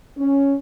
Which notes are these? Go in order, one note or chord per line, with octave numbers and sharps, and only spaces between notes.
C#4